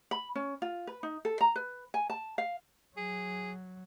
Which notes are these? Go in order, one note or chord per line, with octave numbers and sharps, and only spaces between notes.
B5
C#4
F4
B4
D#4
A4
A#5
B4
G#5
A5
F5
F#3 G#4